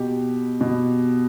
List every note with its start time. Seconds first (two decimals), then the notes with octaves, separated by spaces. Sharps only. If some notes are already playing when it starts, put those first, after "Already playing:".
Already playing: B2 G4
0.61 B2